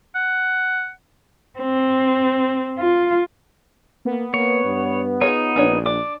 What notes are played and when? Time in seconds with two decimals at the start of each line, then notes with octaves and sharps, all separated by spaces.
0.15 F#5
1.59 C4
2.78 F4
4.05 A#3 B3
4.34 A#3 C#5
4.64 G2
5.21 D#4 F4 G#4 C#5
5.56 A#1 C#4 D4 C#5
5.86 D4 D6